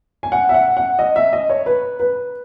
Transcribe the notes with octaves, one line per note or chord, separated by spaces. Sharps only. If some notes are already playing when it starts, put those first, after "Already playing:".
G#5
F#5
E5
F#5
F#5
D#5
E5
D#5
C#5
B4
B4